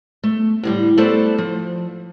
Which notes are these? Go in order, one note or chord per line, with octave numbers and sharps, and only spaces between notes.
A3
A2 D3 G3
A3 B3 A4 C5 D5
F3